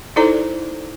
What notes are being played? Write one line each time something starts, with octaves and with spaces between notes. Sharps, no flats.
D#4 E4 A4 C5 D5 A#5